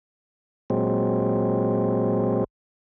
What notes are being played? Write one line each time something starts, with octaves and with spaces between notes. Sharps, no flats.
A#2 F#3 G#3 C4